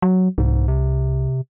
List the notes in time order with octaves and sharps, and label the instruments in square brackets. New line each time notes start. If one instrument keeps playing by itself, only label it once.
[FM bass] F#3
[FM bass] C2 [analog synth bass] G#2
[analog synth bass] C3